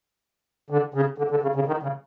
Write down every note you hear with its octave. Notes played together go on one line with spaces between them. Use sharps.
D3
C#3
D3
D3
C#3
C#3
D#3
C#3